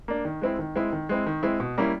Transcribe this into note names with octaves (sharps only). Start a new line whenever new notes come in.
A#3 D4
D#3
G#3 C4 E4
D#3
G#3 C4 E4
D#3
G#3 C4 E4
D#3
G#3 C4 E4
B2
G3 A#3 C#4 E4